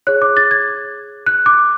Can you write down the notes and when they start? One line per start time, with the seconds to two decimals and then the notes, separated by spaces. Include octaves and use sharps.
0.07 G#4 C#5 F#6
0.22 D6
0.37 A6
0.51 G#6
1.26 F#6
1.46 D6